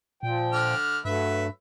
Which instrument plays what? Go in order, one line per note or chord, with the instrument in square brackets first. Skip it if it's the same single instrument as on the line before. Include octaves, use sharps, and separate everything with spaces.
[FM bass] A#2 [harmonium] F3 G5
[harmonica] D3 F6
[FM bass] G2 [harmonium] F#3 A3 [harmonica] B4 E5